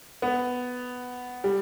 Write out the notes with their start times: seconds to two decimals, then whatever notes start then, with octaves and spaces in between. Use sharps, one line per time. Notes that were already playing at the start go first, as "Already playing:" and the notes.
0.22 B3
1.44 G3